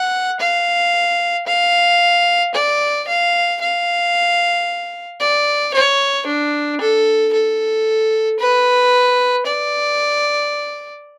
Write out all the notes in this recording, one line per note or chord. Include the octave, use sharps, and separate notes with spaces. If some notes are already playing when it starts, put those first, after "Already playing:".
Already playing: F#5
F5
F5
D5
F5
F5
D5
C#5
D4
A4
A4
B4
D5